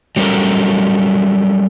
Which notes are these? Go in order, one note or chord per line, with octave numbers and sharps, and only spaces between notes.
F#3 G3 C#4 A4 A#4